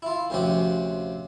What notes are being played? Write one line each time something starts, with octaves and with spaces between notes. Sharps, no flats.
E4 F4
D2 C3 F3 C#4 F#4 G4